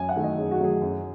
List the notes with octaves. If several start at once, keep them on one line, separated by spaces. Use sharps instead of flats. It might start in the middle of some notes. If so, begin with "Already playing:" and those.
Already playing: F#2 G#5
F#5
D#3 F#3 A3
D#5
F#2 G#4
F#4
D#3 F#3 A3 G#4
F#2